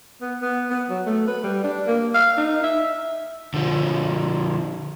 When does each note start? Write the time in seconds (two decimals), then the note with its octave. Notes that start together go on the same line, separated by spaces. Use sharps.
0.21 B3
0.42 B3
0.70 B3
0.90 F#3
1.07 A3
1.28 B4
1.44 G3
1.64 D4
1.87 A#3
2.14 F5
2.38 D#4
2.63 E5
3.54 D3 F3